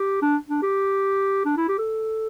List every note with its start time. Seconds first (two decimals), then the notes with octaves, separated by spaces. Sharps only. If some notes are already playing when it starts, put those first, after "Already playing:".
Already playing: G4
0.22 D4
0.49 D4
0.62 G4
1.45 D4
1.57 E4
1.68 G4
1.78 A4